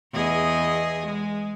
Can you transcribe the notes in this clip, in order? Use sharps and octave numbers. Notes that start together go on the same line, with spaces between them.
E2 G#4 D#5
G#3